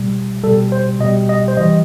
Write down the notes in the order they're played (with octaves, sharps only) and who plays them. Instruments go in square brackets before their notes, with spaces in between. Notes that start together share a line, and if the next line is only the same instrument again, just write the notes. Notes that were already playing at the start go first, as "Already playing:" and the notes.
Already playing: [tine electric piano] B2 G3
B2 G3 A4
C5
B2 D#5
G3
D#5
C5
E3 G3 D#5